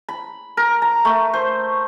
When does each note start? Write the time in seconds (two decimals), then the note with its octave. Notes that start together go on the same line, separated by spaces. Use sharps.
0.08 B5
0.57 A#4
0.82 A#5
1.05 A3
1.34 C5